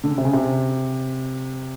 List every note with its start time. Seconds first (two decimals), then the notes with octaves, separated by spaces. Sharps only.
0.04 D3
0.10 C#3
0.18 C3
0.25 C#3
0.33 C3